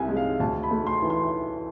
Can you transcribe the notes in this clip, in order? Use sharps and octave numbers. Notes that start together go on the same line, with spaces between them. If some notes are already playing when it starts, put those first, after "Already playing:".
Already playing: C2 C3 G#5
G#3
F5
D2 A5
B5
A3
C6
E3
C6